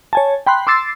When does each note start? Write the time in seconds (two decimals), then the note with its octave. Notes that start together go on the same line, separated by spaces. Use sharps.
0.13 C#5 G#5 A5
0.47 G5 B5 C6 F#6
0.67 C6 D6 E6 A6 C7